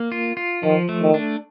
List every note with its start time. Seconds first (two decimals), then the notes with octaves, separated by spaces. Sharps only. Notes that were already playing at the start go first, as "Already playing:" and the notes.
Already playing: A#3
0.12 F4
0.37 F4
0.63 D#3 F3
0.89 A3
1.02 D#3
1.14 D4